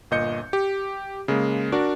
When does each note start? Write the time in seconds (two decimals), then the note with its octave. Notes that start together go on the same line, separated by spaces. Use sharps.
0.11 G1 A#2 D#5 G6 C#7
0.53 G4
1.28 C#3 G#3 A#3
1.72 D4 F#4 A#4 D5